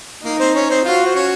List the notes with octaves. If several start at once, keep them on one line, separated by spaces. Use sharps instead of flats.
A#3 D#4 A#4
C4 C5
C#4 C#5
C4 C5
F4 F#4 F5
C5
C#4 C#5